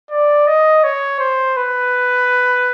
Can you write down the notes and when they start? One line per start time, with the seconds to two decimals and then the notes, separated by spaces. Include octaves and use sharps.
0.11 D5
0.47 D#5
0.83 C#5
1.20 C5
1.57 B4